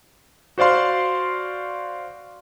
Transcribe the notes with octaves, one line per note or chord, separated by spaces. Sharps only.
F#4 C5 D5 F5 C6